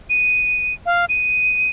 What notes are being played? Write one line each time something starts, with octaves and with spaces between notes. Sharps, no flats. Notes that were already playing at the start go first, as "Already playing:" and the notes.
D#7
F5
D#7